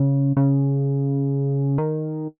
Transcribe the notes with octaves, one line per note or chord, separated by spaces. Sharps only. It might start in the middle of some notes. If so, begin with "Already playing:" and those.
Already playing: C#3
C#3
D#3